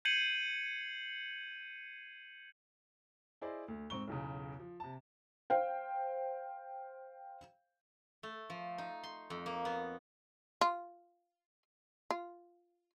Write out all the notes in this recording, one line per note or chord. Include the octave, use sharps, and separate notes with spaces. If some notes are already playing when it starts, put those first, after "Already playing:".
G6 G#6 C7 C#7 D#7 F#7
E4 G#4 C5 D5 D#5
D2
G#2 C4 C#6 G7
B1 E2 C#3
F3
C3 A5
C5 F5 G5
A3
F3
D#4
C6
F2
A#3
B3
F4
F4